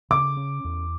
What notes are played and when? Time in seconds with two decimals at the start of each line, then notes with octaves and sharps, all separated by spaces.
0.10 C#3 D6
0.37 C#4
0.64 E2